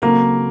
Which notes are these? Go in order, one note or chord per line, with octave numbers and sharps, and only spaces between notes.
C#3 F#3 A#3 C4 F#4 A4